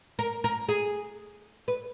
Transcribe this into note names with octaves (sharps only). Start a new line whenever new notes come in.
A#4
A#4
G#4
B4